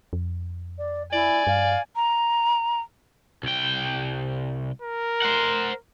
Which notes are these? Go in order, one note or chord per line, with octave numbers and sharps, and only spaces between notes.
F2
D5
E4 D5 G#5
G2 F5
A#5
C2 G5
A#4
C5 F#5